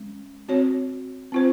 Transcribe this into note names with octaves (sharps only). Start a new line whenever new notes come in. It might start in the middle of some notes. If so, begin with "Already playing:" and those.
Already playing: G#3 C#4
C4 F#4 C#5
C4 F4 C5